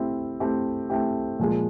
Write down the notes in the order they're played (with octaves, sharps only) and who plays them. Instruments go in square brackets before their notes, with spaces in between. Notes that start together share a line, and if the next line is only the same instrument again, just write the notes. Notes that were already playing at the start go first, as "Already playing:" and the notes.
Already playing: [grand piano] A3 C4 E4 G4
A3 C4 E4 G4
A3 C4 E4 G4
A#2 F3 G#3